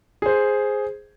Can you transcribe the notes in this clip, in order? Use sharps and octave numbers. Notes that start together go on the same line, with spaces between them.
G#4 C5